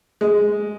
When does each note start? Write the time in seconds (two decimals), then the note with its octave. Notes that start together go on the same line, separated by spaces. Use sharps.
0.21 G#3